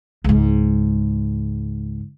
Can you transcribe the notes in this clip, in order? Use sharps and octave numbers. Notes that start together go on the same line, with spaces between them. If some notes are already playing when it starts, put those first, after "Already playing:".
C#2 G#2